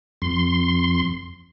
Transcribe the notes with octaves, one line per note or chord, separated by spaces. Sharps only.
F2 C6